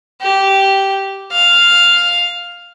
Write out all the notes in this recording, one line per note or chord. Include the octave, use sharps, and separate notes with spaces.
G4
F5